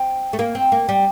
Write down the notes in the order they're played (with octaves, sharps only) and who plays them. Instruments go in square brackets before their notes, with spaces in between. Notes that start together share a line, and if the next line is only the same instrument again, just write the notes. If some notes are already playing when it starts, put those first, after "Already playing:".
Already playing: [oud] C4
A3
A#3
C4
A#3
G3